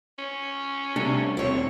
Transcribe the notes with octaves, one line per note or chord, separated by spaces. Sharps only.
C#4
C3 G3 A3 D4
D#1 C4 E4 C#5